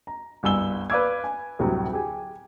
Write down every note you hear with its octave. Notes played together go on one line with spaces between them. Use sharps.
A#5
G1 C2 G#5 E6 G7
B4 D5 F5 D6 E6 G#6
G#5
D2 A2 C3 F#3 G3
G4 G#4 G#5